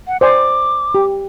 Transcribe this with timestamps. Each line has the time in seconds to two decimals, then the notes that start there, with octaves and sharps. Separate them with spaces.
0.07 F#5
0.21 C5 D5 G#5 D6
0.95 G4